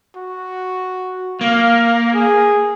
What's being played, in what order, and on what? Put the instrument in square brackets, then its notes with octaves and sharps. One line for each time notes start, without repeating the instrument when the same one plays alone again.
[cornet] F#4
[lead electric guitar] A#3 [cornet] F5
[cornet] G#4